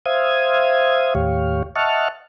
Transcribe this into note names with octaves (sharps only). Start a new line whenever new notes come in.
C5 E5 F5 D#6 G#6
D#2 A2 G4 C#5 F5
D#5 E5 F#5 A5 C#6 F6